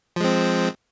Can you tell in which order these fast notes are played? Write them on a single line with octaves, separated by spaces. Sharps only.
F3 G#3 C4